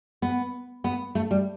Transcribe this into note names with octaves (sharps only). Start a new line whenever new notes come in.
B3
B3
A3
G3